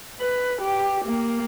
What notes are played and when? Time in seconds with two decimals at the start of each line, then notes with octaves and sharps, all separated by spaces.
0.20 B4
0.62 G4
1.05 A#3